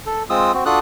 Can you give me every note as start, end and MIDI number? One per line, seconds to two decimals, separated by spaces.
0.06 0.23 69
0.30 0.52 56
0.30 0.52 60
0.30 0.52 65
0.30 0.52 87
0.30 0.52 88
0.54 0.64 60
0.54 0.64 66
0.66 0.79 62
0.66 0.79 65
0.66 0.79 66
0.66 0.79 69
0.66 0.79 87
0.66 0.79 90